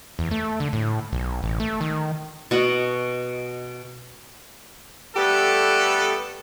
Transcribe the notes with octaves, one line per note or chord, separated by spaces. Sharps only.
E2
A3
D3
A2
B1
A1
A3
D#3
B2 F#4 D#5 F#5
G3 A3 B3 G4 A4 B4